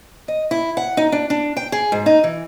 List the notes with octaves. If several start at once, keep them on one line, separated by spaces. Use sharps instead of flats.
D#5
E4
F#5
D#4
D4
D4
G5
G#4
G#2
D#4
E3